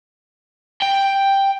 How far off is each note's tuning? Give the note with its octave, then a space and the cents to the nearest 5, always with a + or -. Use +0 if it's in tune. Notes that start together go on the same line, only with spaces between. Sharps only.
G5 +5